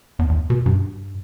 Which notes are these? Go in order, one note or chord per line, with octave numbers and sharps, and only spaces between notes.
E2
E2
B2
G2